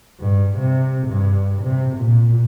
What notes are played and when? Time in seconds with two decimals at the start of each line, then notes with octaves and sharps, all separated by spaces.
0.19 G2
0.59 C3
1.08 G2
1.63 C3
1.97 A#2